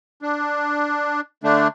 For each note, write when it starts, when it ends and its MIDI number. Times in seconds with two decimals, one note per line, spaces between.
0.22 1.21 62
1.43 1.68 50
1.43 1.68 57
1.43 1.68 62